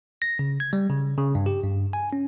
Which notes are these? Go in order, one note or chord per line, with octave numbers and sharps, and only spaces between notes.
A#6
C#3
G#6
G3
C#3
C#3
G2
G4
G2
G#5
C#4